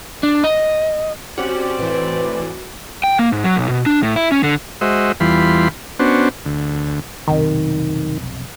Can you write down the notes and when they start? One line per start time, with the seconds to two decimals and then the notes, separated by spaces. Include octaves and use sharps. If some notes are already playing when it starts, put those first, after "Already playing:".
0.23 D4
0.44 D#5
1.38 C4 C#4 F#4 G4 D5
1.79 A2 E3 B4
3.04 G5
3.19 A#3
3.32 G#2
3.44 F#3
3.56 B1
3.69 B2
3.86 D4
4.03 A2
4.16 E4
4.32 C#4
4.43 D3
4.81 G#3 F#4 C5 D#5 E5
5.20 E2 E3 G3 F4 B5 C6
5.99 B3 C#4 D4 F#4 C5
6.45 D2
7.28 F1 B1 C3 D#3